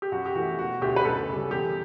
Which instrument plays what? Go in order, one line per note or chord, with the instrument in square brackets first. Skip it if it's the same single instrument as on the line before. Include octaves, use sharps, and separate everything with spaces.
[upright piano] G4
F#2 F#4
G4
E3 A3 F#4
E1 F#4
D2 D3 G4
B4
F#2 A4
C#3 G3
E2 G4